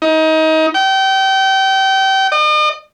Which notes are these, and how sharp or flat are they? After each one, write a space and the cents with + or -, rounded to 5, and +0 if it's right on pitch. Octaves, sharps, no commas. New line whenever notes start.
D#4 +25
G5 -30
D#5 -45